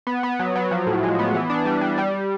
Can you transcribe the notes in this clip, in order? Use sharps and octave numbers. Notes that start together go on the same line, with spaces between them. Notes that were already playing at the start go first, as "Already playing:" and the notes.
B3
B3
F#3
F#3
F3
A2
G#3
B3
E3
D4
G3
G3
G3